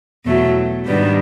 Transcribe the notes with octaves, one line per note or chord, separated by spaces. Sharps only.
E2 B2 F#3 A3
G#2 D#3 G3 B3 D4